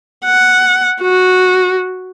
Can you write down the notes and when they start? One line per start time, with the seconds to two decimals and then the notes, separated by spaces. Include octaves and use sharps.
0.25 F#5
1.01 F#4